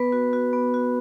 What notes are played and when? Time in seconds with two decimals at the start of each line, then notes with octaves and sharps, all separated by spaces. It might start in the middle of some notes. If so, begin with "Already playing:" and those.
Already playing: B3 B4
0.12 F#4
0.33 F#4
0.53 B3
0.74 F#4